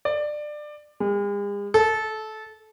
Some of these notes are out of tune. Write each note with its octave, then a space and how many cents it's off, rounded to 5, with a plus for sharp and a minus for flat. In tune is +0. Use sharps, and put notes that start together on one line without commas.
D5 +20
G#3 -45
A4 -20